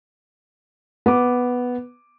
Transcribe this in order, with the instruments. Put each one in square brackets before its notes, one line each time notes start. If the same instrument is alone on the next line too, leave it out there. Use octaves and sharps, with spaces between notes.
[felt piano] B3 D6